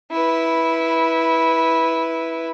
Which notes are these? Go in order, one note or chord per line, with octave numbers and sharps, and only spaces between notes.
E4 B4